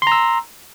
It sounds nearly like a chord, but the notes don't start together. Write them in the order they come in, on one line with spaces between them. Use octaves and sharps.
C6 A#5 E6